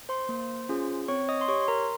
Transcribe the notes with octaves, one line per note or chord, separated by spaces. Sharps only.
C5 C6
A#3
C#4 F4 G#4
C4 C#5 C#6
D#5 D#6
C6
G4 C#5 C#6
C6
A#4 A#5